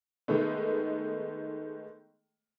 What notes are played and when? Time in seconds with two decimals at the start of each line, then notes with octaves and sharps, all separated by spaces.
0.28 D#3 G#3 A3 B3